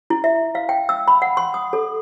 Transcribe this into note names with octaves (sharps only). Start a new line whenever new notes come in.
E4
E5
F5
G5
E6
B5
F#5
C6
D#6
A4